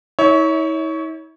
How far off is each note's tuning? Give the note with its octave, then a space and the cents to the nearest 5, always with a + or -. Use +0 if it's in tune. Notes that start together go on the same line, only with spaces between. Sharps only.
E4 -45 C#5 +15 E5 -35